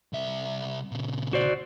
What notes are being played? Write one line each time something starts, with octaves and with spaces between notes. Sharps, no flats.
C2 E5
A#2 C#3
F#4 C5 D5